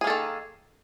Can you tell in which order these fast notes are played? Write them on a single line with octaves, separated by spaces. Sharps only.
G#4 A#3 A4 D#3